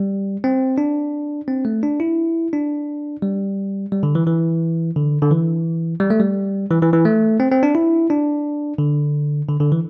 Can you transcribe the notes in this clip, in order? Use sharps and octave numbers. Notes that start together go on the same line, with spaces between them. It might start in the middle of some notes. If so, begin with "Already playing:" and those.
Already playing: G3
C4
D4
C4
A3
D4
E4
D4
G3
G3
D3
E3
E3
D3
D3
E3
G3
A3
G3
E3
E3
E3
A3
C4
C4
D4
E4
D4
D3
D3
D3
E3